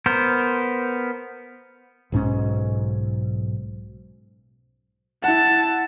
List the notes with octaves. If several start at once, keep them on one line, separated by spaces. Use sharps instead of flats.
B3 A#4 C5
B1 G#2 E3 C#4
E4 F#5 A5